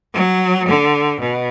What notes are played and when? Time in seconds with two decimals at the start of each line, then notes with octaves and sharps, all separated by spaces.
0.14 F#3
0.68 D3
1.21 B2